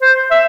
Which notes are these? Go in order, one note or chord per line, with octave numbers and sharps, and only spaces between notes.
C5
E5